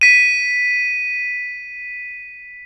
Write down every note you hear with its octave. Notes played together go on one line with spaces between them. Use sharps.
B6 D#7